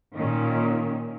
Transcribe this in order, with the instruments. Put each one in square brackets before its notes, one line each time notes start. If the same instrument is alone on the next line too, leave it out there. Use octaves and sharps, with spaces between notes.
[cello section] A#2 D#3 C#4